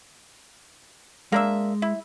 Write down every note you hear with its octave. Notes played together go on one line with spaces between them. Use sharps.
G#3 A#3 D4 E5
E4